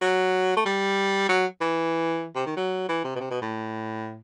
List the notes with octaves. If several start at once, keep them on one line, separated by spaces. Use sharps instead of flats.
F#3
A3
G3
F#3
E3
C3
D#3
F#3
E3
C3
B2
C3
B2
A2